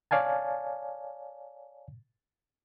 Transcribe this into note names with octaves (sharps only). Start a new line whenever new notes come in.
C#5 D5 F5 G#5 A5